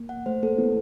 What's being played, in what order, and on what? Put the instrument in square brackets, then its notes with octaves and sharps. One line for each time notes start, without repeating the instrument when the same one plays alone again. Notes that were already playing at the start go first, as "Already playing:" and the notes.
Already playing: [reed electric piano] A#3
[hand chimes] F#5
[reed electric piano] A3 [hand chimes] C5
[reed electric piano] A#3 [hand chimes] A4
[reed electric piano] B3 [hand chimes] E4